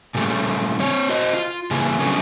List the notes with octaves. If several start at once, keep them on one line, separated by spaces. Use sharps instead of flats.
A#2 C#3 G3 A3
C4 C#5
F#4 C5 D#5
F4
C#3 E3 G3 A#3
D3 F#3 G3 A3 B3 C#4